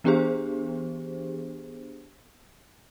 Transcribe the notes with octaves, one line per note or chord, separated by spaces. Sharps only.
E3 B3 D4 G4 G#4 C5